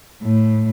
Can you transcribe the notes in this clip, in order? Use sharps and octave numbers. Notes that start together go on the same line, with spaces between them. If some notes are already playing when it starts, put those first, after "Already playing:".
A2